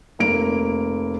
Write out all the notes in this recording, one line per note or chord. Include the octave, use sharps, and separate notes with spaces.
F1 A#3 D7